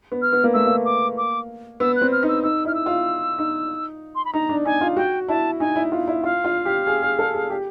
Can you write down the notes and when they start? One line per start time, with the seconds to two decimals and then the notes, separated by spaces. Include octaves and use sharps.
0.12 B3
0.22 F6
0.33 B3
0.44 A#3
0.54 A3 E6
0.67 A#3
0.85 D6
1.18 D6
1.80 B3 E6
1.96 F#6
2.01 C4
2.12 F6
2.23 D#4
2.28 E6
2.43 D#4 E6
2.65 E4 F6
2.75 E6
2.86 F4
3.38 D#4
4.15 C6
4.25 B5
4.33 D#4 A#5
4.49 D4
4.65 D#4 G#5
4.81 F4
4.97 F#4 G5
5.28 E4 A5
5.60 D#4 G#5
5.76 E4
5.92 F4
6.08 E4
6.23 F4 F5
6.44 F4
6.65 G4
6.87 G#4
7.03 G#4
7.19 A4
7.34 G#4
7.50 G4